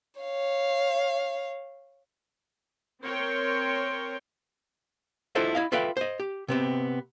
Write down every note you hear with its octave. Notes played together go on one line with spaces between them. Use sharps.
C#5 F5
C4 A#4 C#5 G5 C6
D4 E4 F4 A4 C5 D#5
E4 D#5 F5
F4 A4 B4 E5 F5 G5
C5 D#5
G4
C3 B3 C4